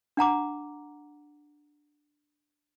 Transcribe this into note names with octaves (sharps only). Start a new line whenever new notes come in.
D4 F#5 A#5 D6